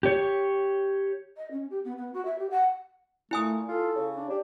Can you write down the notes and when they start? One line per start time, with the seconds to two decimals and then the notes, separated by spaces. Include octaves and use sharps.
0.03 G4 C#5
1.37 D#5
1.51 C#4
1.70 G4
1.84 B3
1.97 B3
2.14 F#4
2.25 E5
2.39 G4
2.50 F#5
3.31 A#2 A3 E4 G#5 D#6
3.68 F4 A4
3.95 C#3
4.17 D4
4.29 D4 G4